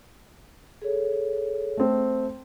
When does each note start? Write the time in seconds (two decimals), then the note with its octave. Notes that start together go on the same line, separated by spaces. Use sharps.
0.82 G#4 A4 C#5
1.77 A3 C4